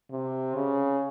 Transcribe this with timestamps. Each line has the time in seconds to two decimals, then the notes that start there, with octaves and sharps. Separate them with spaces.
0.11 C3
0.54 C#3